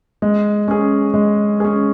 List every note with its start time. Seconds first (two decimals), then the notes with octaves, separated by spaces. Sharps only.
0.22 G#3
0.68 C#4 G#4
1.14 G#3
1.60 C#4 G#4